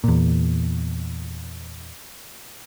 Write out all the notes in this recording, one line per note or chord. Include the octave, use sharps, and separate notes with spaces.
E2 A#2